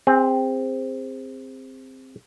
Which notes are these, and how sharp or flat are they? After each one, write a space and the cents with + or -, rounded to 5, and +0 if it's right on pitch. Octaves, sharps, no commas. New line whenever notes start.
C4 +0 G#4 -30